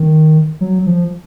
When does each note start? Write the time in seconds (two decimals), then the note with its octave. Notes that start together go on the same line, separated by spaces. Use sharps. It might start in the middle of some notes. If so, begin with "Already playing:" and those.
Already playing: D#3
0.61 F#3
0.86 F3